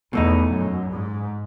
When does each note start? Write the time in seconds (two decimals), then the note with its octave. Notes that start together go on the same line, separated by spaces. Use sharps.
0.13 E2 B2 A3 D#4
0.52 F#2
0.91 G#2